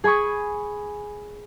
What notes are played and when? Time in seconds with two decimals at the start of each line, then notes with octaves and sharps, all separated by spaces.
0.04 G#4 G#5 B5 C#6 D#6